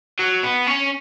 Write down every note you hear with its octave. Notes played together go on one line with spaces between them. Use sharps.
F#3
B3
C#4